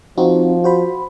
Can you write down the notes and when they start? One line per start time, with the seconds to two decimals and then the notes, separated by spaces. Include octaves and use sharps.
0.18 F3 C4 D#4 F#4
0.64 F#4 C5 B5